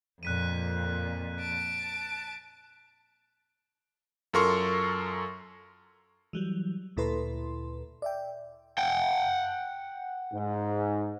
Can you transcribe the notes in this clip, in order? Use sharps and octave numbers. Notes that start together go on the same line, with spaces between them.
F2 A#2 F#6 B6 D#7
A5 D7
F#2 F4 A4 A#4 C6 C#6
E3 F#3 G3
D2 A#2 E4 A4 B4 C6
D5 E5 G5
F#5 G5
G#2